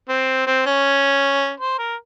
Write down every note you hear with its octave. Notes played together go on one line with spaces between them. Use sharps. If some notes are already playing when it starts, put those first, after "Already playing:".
C4
C4
C#4
C5
A#4